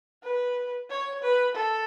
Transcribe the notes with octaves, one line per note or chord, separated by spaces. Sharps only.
B4
C#5
B4
A4